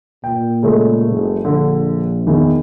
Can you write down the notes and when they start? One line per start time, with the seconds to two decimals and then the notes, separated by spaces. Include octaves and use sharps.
0.24 A#2 G5
0.63 C#3 G#3 A3
1.12 F#1
1.45 A#1 D3
2.27 E2 D#3